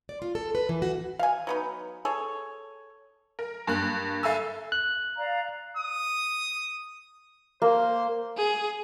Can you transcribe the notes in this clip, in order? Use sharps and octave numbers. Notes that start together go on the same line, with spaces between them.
D5
F4
A4
B4
E3
F#4
F5 G#5
F#3 B3 D#4
G#4 A4 C#5
A#4
G2 A#3 F#6
A4 E5 F5 G#5 E6
F#6
D5 F5 A#5
D#6
A#3 C5
G#4